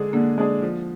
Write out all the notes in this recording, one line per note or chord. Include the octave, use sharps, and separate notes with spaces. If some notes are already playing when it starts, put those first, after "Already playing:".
Already playing: D3 G#3 D4 G#4
D3 A#3
G#3 D4 G#4
F3